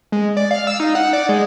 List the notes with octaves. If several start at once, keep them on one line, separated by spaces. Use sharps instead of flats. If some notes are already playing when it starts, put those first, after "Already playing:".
G#3
D5
F5
E6
D#4
F#5
D5
G#3